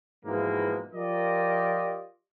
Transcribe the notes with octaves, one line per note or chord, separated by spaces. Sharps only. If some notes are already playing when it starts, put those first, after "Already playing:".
G#2 B2 E3 F3 G#3 A#3
F3 F4 G4 A#4 D5 D#5